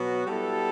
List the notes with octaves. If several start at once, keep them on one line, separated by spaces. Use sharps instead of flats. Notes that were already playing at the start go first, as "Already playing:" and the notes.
Already playing: B2 F#3 F#4
G3 B3 E4 A4